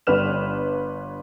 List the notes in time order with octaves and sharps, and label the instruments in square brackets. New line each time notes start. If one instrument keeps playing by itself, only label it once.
[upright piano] G1 G3 B4 F6 E7